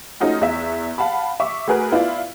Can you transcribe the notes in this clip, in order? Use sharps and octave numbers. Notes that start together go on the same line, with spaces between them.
A3 C#4 D#4 F4 F#4
E2 E5
F5 F#5 A5 B5
E5 C#6 D6
A3 F#4 G#4 A#4 B4
B3 E4 F4 D5 F5